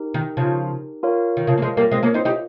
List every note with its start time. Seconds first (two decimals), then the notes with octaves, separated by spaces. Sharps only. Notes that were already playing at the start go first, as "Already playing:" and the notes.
Already playing: D#4 G4 A#4
0.14 D#3
0.37 C#3 F3
1.03 F4 A#4 C#5 F5
1.37 D#3
1.47 C#3 F3
1.58 A#3
1.62 F3 G#3
1.77 G3 A#3
1.92 G#3 C4
2.03 A#3 C#4
2.14 C4 D#4
2.25 D#4 G4